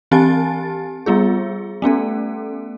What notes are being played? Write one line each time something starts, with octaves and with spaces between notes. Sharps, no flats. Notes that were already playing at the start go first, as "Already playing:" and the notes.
E3 C4 G4 G#5 A5 A6
G3 B3 F4 G#4
A3 B3 C#4 A4